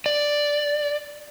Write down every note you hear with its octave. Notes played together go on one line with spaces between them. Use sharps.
D5